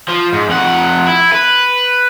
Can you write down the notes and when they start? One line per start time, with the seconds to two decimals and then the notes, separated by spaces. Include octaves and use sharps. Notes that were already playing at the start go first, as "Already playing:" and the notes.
0.08 F3
0.33 G#2
0.50 F2 F#5
1.07 E4
1.33 B4